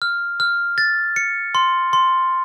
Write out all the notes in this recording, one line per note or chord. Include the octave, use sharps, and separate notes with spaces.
F6
F6
A6
C#7
C6
C6